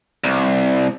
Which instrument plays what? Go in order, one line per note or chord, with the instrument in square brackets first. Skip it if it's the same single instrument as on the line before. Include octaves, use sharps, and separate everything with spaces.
[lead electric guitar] C2